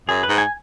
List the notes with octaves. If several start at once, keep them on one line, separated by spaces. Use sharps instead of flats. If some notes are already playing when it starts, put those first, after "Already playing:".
F#2 G#4
B4
G#2
G#5